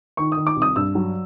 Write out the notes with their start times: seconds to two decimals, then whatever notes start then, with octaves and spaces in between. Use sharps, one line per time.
0.17 D#3 C#6
0.32 D#6
0.37 D#3
0.47 D6
0.56 C2
0.62 D#6
0.76 G2 E6
0.95 F#3